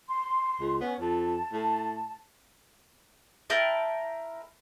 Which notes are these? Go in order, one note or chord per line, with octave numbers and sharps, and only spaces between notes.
C6
C#2
B3 C#4
F2 A5
A2
E4 A#4 G5 A5